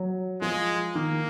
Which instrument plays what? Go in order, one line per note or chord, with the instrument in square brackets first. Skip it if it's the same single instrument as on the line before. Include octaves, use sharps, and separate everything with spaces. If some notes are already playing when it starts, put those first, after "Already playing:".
Already playing: [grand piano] F#3
[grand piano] F3 [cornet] G#3
[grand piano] D#3 [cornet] A#3